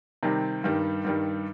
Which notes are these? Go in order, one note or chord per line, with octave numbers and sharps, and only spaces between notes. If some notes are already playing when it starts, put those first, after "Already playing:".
C3 D#3 G3 C4
G2 D#3 G3
G2 D#3 G3